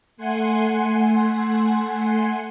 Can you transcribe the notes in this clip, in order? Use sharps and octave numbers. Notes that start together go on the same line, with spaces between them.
A3 F#5 G#5 C6